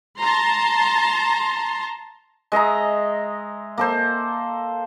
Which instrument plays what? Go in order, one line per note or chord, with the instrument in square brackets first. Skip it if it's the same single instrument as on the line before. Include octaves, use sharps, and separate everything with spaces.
[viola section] A5 A#5 C6
[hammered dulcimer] G#3 D#5 E5 A#5
A#3 A4 C5